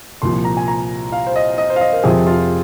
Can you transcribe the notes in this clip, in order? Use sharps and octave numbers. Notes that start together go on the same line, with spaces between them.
C2 A#2 F3 C6
A#5
G#5
A#5
F5
C5
D#5
D#5
C5
F5
D#5
A#4
F2 C3 F3 G#4
F4